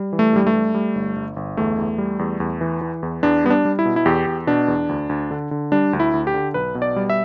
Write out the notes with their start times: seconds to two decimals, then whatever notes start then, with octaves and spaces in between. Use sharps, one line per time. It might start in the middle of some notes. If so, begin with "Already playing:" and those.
Already playing: G3
0.13 E3
0.19 A3
0.33 G2 G3
0.47 A3
0.54 G3
0.74 G3
0.95 G1
1.16 G1
1.36 G1
1.57 E2 A3
1.78 E2
1.98 G3
2.19 E2
2.40 E2
2.61 E3
2.81 E3
3.03 E2
3.23 E2 D4
3.44 G3 B3
3.50 D4
3.65 G3
3.79 E4
3.85 B2
3.96 E4
4.06 E2 G4
4.27 E2
4.47 B2 D4
4.68 E2
4.89 D2
5.09 D2
5.31 D3
5.51 D3
5.72 G3 D4
5.93 D2
6.00 E4
6.14 D2
6.27 G4
6.34 D3
6.54 B1 B4
6.75 B2
6.82 D5
6.96 G3
7.10 E5